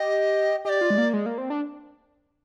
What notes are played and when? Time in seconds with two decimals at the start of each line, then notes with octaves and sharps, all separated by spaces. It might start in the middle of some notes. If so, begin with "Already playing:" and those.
Already playing: G4 D#5
0.65 G4 D#5
0.69 D5
0.81 F4
0.90 G#3
0.98 A#3
1.13 G#3
1.26 A#3
1.38 C4
1.50 D4